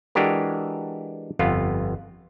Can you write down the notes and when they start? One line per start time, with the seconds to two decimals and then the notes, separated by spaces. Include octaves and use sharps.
0.15 E3 G#3 D4 F#4 G4 A#4
1.39 G1 F2 B3 F4